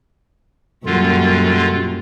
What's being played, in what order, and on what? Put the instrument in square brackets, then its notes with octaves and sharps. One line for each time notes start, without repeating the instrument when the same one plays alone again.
[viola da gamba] F#2 A#2 G3 [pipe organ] D3 F4